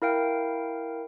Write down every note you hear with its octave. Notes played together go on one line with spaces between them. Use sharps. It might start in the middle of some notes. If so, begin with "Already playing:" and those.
E4 A#4 F5 G5